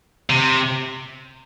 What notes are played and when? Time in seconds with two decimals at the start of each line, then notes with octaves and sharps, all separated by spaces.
0.30 C3